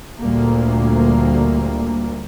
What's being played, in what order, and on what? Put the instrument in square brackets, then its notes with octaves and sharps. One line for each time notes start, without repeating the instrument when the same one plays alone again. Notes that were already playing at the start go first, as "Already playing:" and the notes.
[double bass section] D2 A#2 G3 A#3